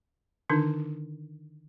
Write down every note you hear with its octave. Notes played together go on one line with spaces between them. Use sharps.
D3 D#3 D4 D#4